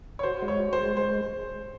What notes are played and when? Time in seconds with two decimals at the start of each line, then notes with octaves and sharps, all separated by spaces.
0.19 C#5
0.23 F#4 C5
0.42 G#3
0.48 C#5
0.60 F#4
0.73 C5
0.79 G#3
0.97 G#3 C5